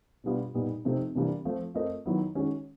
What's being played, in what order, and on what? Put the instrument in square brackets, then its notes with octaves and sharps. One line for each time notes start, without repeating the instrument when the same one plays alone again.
[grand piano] B2 G3 B3 D4 F4
A#2 G3 B3 D#4
C3 F3 A3 C4 D#4
C3 E3 G3 A#3 D4
F3 A3 C4
A3 C4 F4 A#4 D#5
D#3 F#3 B3 E4
D#3 G#3 C#4 F#4